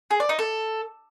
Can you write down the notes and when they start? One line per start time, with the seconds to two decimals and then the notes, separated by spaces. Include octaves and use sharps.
0.11 G#4
0.20 D5
0.29 D#4
0.39 A4